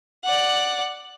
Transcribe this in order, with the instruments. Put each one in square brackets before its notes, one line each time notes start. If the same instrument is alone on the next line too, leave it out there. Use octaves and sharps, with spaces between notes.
[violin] D5 F#5